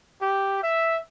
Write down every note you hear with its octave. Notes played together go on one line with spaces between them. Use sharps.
G4
E5